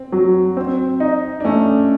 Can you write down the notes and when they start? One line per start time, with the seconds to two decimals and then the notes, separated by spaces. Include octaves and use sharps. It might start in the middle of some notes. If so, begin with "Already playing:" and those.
Already playing: C4
0.12 F#3
0.57 C4
1.00 D#4
1.40 D4
1.44 A3 C#4